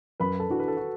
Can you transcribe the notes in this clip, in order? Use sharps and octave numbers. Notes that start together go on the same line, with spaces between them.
F#2 B4 B5
A4 A5
E3 D4 F#4
B4
A4
F#4